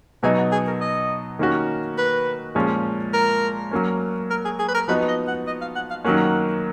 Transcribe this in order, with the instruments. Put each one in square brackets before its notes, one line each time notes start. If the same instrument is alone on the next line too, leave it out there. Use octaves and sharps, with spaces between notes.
[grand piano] B2 F#3 B3 D#4 [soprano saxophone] G#4
[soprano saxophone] F#4
G#4
A#4
D#5
[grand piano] D#3 A#3 C#4 F#4
[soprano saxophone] B4
[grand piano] A#2 F3 G#3 C#4
[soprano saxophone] A#4
[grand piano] F#3 A#3 C#4
[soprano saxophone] A#4
G#4
G#4
B4
A#4
[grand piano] F3 B3 D#4 F#4 [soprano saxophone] B4
[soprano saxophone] D#5
F#5
D#5
F5
F#5
F5
[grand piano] D#3 F#3 A#3 C#4 [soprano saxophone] F#5